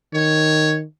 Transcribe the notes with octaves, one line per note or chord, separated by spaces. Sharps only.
D#3 C#5